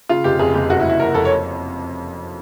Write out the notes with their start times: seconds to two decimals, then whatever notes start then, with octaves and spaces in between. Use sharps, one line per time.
0.09 C#3 F4
0.24 F1 G4
0.39 F2 G#4
0.54 F1 G4
0.70 F#1 F#4
0.80 E4
0.85 F#1
0.90 E4
1.00 F2 A#4
1.14 F2 A4
1.25 C#5